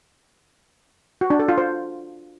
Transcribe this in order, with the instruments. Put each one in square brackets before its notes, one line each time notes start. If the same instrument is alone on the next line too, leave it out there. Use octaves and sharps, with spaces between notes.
[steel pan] F#4
D4
A4
F4
C5